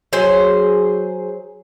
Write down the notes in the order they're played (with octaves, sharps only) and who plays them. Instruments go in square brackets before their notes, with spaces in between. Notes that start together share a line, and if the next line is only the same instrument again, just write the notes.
[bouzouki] F#3 G#4 C5